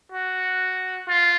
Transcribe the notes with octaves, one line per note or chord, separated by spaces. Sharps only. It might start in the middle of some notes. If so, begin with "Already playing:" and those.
F#4
F4